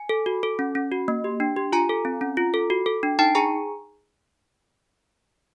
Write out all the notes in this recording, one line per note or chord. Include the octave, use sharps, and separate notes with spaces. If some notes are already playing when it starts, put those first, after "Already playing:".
Already playing: G#5
A4
F#4
A4
C#4
C#4
F#4
A#3
G4
D4
G4
F4 G#5 A#5
A4
C4
C#4
F4
A4
F#4
A4
D4
D#4 G5 A5
G#4 G#5 A#5